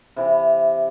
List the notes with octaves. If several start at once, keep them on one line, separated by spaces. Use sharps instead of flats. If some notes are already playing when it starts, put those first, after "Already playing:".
C3 E3